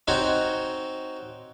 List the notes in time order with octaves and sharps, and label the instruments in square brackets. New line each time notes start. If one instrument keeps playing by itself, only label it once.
[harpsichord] C4 D#4 F#4 C#5